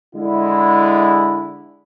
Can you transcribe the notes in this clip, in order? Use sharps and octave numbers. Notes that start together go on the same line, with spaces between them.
D3 G#3 E4